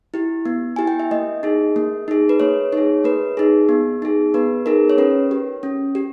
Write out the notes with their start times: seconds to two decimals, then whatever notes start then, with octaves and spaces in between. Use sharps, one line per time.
0.14 E4 G4
0.46 B3
0.76 E4 G4 G#5
0.87 G5
1.00 E5
1.11 A#3 D#5
1.43 D#4 G#4
1.76 A#3
2.08 D#4 G#4
2.29 B4
2.40 A#3 C#5
2.73 D#4 G#4 C#5
3.04 A#3 B4
3.37 D#4 G#4
3.69 B3
4.02 D#4 G#4
4.34 B3 B4
4.66 D#4 G#4 A#4
4.90 C#5
4.98 C#4 B4
5.31 G4
5.63 C#4
5.95 G4